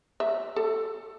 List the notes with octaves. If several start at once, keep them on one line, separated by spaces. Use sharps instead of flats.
E5
A4